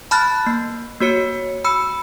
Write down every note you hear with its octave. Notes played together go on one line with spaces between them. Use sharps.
A5 B5 F6 F#6 A6
A#3
A#3 F#4 C#5 C#7
B5 E6 C#7